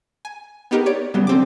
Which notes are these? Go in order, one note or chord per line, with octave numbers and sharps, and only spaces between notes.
G#5
B3 D#4 G4 A#4 B4
C#5 D5 D7
C#3 F#3 G3 B3
D3 C4 D6